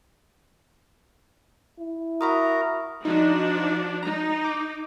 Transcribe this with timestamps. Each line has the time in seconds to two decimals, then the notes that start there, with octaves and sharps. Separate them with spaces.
1.80 E4
2.21 F#4 A#4 E5 A#5 B5 D#6
3.05 F3 D4 D#4 F#4
4.03 D#4 A#5
4.45 D6